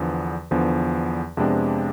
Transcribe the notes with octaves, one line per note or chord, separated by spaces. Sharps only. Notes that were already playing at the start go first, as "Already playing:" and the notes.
Already playing: E2 D3 F3 B3
E2 D3 F3 B3
F2 C3 G#3 B3 D4